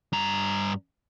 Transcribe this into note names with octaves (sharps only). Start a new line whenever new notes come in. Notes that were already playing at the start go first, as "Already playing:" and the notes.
G2 A#5